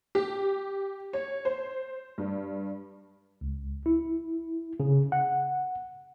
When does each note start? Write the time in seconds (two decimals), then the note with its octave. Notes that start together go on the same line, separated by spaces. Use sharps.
0.15 G4
1.13 C#5
1.45 C5
2.18 G2
3.41 C#2
3.86 E4
4.80 C#3
5.12 F#5